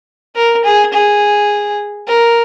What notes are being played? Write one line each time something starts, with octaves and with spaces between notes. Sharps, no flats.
A#4
G#4
G#4
A#4